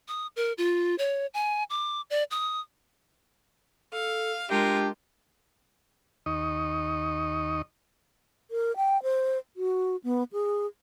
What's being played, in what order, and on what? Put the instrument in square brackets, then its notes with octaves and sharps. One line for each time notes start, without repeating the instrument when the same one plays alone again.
[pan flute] D#6
A#4
F4
C#5
G#5
D6
D5
D#6
[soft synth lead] A4 [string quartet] F5
[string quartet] G#3 F4 A#4 [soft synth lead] D4 [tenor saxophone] G4
[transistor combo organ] D#2 D#4 D#5 C#6
[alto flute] A#4
G5
C5
F#4
B3
G#4